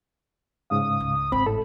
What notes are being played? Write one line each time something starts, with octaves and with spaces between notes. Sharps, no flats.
G#2 C#3 F5 D#6
C#2
G#1 C4 B5
A2 A4